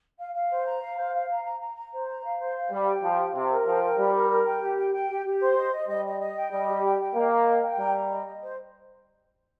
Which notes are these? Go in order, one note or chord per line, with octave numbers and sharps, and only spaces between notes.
F5
F5
C5
A#5
F5
C5
F5
A#5
A#5
A#5
A#5
C5
A#5
F5
C5
F5
G3 G4
G5
F3 G4
G5
C3 G5
A#4
F3 G5
A#4
G3 G4
A#4
A#4
G5
G4
G5
G5
G4
G4
C5
D#5
D#5
G3 D#5
D#5
D#5
G5
G3 D#5
G4
G5
G5
A#3 D#5
D#5
G5
G5
G3 A#5
A#5
D#5
D#5
C5